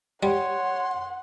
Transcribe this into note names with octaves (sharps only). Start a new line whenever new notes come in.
G3 C#5 F#5 C6